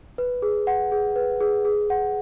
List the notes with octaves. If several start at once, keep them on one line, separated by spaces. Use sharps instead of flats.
B4
G#4
F#5
G#4
B4
G#4
G#4
F#5